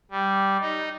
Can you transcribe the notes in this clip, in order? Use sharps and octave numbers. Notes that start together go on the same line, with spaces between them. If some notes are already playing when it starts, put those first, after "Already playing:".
G3
D#4